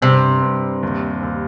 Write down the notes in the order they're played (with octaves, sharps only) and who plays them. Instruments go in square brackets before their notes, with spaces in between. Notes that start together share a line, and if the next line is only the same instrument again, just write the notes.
[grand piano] G2 [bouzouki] C3
[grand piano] G2
D#2
D#2